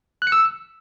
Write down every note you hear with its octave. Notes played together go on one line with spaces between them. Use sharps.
F#6
C#7
E6